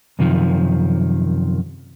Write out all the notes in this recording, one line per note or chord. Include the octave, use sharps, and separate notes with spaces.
F#2 C3 D#3 F3